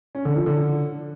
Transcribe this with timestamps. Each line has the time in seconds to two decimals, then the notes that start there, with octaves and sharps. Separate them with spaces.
0.15 C#4
0.25 D3
0.36 F3
0.46 D3